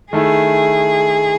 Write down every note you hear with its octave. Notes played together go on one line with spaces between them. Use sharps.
D#3 A3 E4 G#4